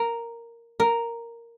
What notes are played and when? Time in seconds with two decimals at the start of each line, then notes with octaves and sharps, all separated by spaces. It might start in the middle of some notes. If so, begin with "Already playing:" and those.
Already playing: A#4
0.80 A#4